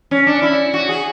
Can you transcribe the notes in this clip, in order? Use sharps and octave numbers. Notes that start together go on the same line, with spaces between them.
C#4
D4
E4
F#4
G#4